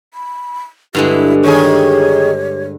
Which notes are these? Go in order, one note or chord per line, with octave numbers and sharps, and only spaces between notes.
B5
G2 D3 G#3 E4 G4
D#3 G#4 C#5